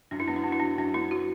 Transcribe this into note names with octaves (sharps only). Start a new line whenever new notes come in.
F#2 D4
E4
B3 D4
E4
D4 F#4
E4
F#3 D4
F#2 D4
B3 E4
F#3 F#4